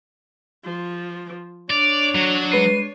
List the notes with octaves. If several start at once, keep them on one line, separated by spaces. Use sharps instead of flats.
F3
D4 C#5 D5 F7
F#3
G#3 B4 C7 D#7